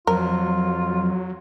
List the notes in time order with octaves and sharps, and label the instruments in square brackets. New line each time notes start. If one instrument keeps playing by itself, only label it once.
[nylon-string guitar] F2 [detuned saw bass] F#3 [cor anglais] F4 [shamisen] A#4